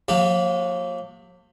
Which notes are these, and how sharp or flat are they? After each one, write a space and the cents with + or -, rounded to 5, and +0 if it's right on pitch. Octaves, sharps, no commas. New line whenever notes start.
F#3 -45 A#3 -10 G4 +0